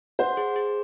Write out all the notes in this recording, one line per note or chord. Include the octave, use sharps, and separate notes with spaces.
C5 F#5
G#4
G#4